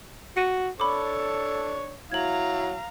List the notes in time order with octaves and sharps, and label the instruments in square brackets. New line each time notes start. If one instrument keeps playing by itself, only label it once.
[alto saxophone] F#4 [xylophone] C#7 D#7
[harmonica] D4 C#5 [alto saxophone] A4 [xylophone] B5 D6
[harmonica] F#3 [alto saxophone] E4 [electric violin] F5 A#5 [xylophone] G#6 F#7